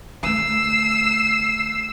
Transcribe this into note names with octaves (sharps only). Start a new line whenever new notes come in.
D3 A3 E6 C7